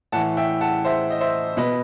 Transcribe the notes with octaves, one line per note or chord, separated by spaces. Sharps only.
A2 E3 F#5 A5
E5 G5
F#5 A5
C5 E5
D#5
C5 E5
B2 B4 D#5